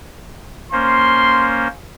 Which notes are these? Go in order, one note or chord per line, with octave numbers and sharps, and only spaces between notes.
A#3 C#4 C5 C6